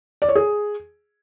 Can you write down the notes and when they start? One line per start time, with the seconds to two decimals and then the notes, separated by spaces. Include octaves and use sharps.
0.22 D5
0.29 C#5
0.35 G#4